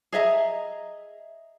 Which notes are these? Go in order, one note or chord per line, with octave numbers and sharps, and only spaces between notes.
G#4 D#5 E5 A#5